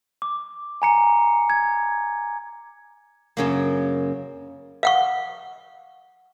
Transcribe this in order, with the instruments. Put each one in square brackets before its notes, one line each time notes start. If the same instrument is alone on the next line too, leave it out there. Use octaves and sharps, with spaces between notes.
[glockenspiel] D6
G#5 A#5 C#7
G#6
[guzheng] F#2 C#3 A#3
[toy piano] F5 F#5 C#6